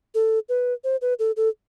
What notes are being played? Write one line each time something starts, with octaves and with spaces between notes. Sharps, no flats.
A4
B4
C5
B4
A4
A4